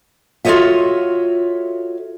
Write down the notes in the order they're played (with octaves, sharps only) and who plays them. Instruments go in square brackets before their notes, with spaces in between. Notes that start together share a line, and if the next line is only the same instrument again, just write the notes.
[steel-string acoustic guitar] F4 F#4 A4 C#5 D#5 E5